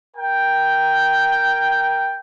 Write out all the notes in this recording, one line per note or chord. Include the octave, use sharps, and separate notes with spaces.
A#4 G5